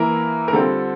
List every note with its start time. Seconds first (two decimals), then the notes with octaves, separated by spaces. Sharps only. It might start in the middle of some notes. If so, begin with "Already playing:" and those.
Already playing: E3 A#3 E4 A#4
0.48 A#4
0.53 D3 G3 C4 F4 A4